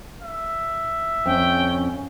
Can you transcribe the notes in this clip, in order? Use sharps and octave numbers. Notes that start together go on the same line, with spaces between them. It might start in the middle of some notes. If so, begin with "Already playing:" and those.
E5
F2 C#4 G5